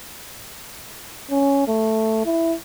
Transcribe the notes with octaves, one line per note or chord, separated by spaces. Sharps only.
C#4
A3
E4